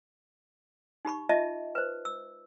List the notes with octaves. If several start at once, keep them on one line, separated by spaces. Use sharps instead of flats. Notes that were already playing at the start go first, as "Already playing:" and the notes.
D#4 G4 B5 C#6
F4 D#5 E5 A5
B4 C5
E6